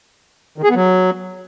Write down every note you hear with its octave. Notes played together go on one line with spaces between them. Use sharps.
D#3
G#4
B3
F#3